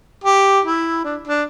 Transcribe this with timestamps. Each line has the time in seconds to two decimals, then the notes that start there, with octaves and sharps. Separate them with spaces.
0.24 G4
0.65 E4
1.04 D4
1.27 D4